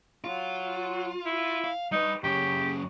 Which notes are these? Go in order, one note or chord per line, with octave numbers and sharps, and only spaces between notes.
F#3 F4
E4
F5
G3 D#4 B4
F#2 C#3 G4